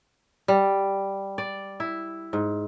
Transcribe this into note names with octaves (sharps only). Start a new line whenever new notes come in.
G3
D5
E4
G#2